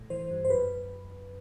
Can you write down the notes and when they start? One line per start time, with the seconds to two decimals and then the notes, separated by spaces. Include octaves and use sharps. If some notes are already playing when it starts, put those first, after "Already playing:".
Already playing: A2
0.10 E3 C5
0.31 G2
0.45 C5
0.50 F#2 B4